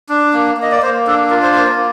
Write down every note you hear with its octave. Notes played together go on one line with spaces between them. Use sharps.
D4
A#3
A#3 D#5
D5
A#3 C5
D4 A4
F4 A#4
C5
A#3 C5
A#4